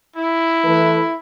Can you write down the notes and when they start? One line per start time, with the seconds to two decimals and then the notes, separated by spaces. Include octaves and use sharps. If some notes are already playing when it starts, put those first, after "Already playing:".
0.16 E4
0.64 E3 A3 B4